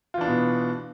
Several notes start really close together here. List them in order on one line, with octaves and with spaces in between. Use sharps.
F4 E3 D4 B3 B2